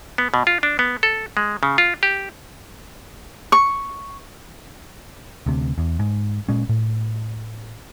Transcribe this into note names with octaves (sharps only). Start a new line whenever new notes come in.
B3
B2
F4
D4
B3
A4
G#3
C#3
F4
G4
C#6
D2 C3
E2
G#2
A#2 G#3 C#4
A2